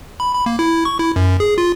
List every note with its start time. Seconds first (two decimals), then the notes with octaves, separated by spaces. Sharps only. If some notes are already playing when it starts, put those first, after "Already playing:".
0.20 B5
0.34 B5
0.46 A#3
0.59 E4
0.85 C#6
0.99 E4
1.16 F#2
1.40 G#4
1.58 F4